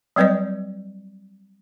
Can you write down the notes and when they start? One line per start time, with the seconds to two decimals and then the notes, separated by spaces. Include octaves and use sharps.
0.16 F#3 G3 C4 B4 D5 D#5